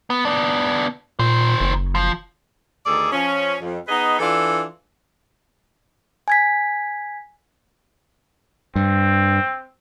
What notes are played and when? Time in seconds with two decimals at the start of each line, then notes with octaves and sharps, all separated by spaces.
0.10 B3
0.25 B3 D4
1.19 A#2 D#3 C5
1.61 F#1
1.95 F3
2.86 D2 D#3 G#4 A4 D5
3.12 F3 C#4
3.61 F2
3.87 B3 D#4 G#4 B4 D#5
4.19 E3 D4 F4 A4
6.28 G#5 G#6 B6
8.76 G2 C4